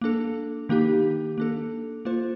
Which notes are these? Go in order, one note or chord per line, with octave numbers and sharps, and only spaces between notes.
A#3 D4 A4
D#3 A#3 D#4 G4
A#3 D4 A4
A#3 F4 C5